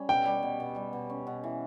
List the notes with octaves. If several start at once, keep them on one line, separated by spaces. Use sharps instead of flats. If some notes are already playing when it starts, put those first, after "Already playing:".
Already playing: G3 C#4
B2 G5
G3
B2
B2
G3
B2
C#4
B2
E3